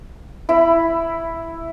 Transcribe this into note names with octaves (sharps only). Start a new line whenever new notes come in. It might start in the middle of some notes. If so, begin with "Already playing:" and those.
E4 B5